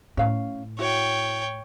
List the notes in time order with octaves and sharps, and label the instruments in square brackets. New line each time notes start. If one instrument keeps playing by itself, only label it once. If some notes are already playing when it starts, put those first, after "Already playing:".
[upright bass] A2 [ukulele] C#4 F5
[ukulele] E4 F#4 [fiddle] C#5 G5